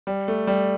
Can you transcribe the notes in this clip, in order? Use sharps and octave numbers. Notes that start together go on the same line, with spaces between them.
G3
A3
G3